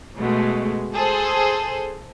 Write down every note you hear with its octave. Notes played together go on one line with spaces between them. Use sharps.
B2 G#3 A3
G#4 A4 C5